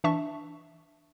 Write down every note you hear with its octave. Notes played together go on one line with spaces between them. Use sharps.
E3 D4 E5 A5 C#6